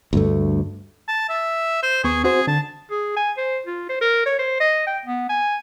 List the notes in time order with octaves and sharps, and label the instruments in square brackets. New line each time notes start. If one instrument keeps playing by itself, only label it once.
[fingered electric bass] D2 G2 A3
[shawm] A5
E5
C5
[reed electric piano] D#2 B3 C#6 [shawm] G#4
[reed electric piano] C4 F#4 C5 [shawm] G#4
[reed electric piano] D3 [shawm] A5
[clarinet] G#4
G#5
C5
F4
C5
A#4
C#5
C5
D#5
G5
B3
G#5